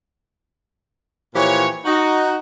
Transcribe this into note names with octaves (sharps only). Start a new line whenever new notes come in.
A#2 E3 F3 G4 C#5
D#4 F#4